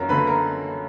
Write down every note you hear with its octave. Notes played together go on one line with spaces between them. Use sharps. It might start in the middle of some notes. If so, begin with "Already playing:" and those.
Already playing: F#2 F#4 A#4 A#5
D3 B4 B5
A#4 A#5